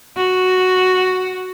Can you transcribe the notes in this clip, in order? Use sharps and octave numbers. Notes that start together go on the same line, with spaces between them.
F#4